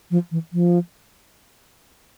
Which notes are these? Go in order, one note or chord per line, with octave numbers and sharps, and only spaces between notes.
F3
E3
F3